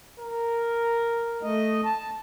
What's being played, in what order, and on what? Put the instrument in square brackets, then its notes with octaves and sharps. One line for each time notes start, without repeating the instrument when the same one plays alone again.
[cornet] A#4
[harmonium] A3 D#5
A5